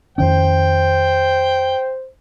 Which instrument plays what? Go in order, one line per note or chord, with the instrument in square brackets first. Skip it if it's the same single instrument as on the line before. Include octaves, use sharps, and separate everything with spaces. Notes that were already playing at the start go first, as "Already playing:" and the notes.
[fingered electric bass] F2 D#3 C#4 [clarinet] C5 [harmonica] G5